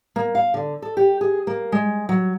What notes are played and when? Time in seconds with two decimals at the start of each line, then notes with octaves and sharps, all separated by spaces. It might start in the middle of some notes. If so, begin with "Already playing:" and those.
0.16 A#3
0.35 F5
0.54 D3
0.82 A4
0.97 G4
1.21 G#4
1.47 A#3
1.72 G#3
2.09 F#3